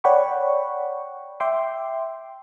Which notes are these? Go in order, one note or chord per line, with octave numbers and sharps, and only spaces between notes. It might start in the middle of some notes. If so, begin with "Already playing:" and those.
C#5 D5 F#5 G5 B5 C#6
E5 G5 C6 D6